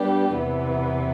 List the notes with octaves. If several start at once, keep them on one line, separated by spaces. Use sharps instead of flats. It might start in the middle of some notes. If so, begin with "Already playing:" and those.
Already playing: G3 B3 D4 G4 B4
E2 C3 E3 B3